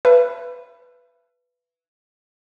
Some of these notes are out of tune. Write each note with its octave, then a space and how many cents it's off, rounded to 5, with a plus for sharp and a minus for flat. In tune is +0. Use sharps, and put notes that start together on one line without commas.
B4 +0 E5 +40 A5 +0